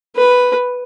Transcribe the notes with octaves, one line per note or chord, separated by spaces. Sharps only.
B4